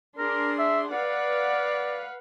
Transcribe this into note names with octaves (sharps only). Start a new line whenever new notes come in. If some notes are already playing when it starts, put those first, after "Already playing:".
D4 G#4 A#4 C6
E5
B4 D5 F5 F#5